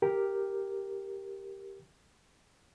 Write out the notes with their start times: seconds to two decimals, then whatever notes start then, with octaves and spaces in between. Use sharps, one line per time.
0.02 G4 A#4